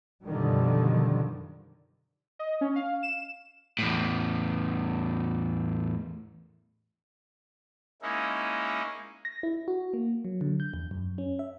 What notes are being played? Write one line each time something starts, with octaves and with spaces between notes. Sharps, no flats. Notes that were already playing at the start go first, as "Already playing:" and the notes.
F#2 B2 D3 D#3 F3 G3
D#5
C#4
F5
E7
E2 A2
G#3 A#3 C#4 D#4 E4
A#6
E4
F#4
A#3
F#3
D3
G6
E2
F#2
C#4
E5